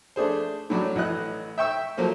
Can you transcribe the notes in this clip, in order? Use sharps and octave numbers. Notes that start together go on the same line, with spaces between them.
A3 D4 G#4 C5
A2 F#3 D4
A1 E3 D#5 F#6
E5 G5 C#6 E6
F3 F#3 A3 A#3 C5